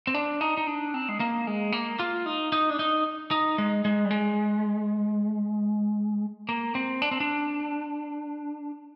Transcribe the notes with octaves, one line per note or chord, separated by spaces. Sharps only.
C4
D4
D#4
D#4
D4
C4
G#3
A#3
G#3
A#3
F4
D#4
D#4
D4
D#4
D#4
G#3
G#3
G3
G#3
A#3
C4
D4
C4
D4